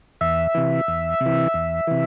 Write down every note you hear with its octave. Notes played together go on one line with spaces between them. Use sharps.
E2 E5
C3 E3
E2
C3
E3
E2
C3 E3